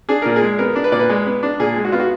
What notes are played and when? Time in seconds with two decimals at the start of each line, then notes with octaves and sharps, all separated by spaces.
0.09 D4 G#4
0.22 A#2 A#4
0.36 G#4
0.42 G#3
0.59 B3 A#4
0.76 D4
0.84 B4
0.92 A#2 D5
0.99 B4
1.09 G#3
1.26 B3
1.43 D4
1.60 A#2 G#4
1.76 G#3
1.85 F#4
1.92 B3 F4
2.00 F#4